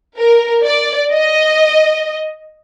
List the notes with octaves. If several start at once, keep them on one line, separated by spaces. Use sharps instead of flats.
A#4
D5
D#5